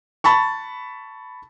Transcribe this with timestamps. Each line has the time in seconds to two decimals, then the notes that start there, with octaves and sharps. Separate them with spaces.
0.24 A5 B5 C#6